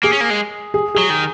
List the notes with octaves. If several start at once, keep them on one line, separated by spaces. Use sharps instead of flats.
A#3 G#4
C#4
A#3
G#3
G#4
F#3 G#4
D#3